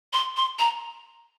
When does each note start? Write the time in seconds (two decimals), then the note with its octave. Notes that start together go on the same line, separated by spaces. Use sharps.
0.13 C6
0.37 C6
0.59 A#5